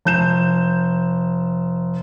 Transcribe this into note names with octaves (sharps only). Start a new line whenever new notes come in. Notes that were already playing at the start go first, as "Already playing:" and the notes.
F1 G6 E7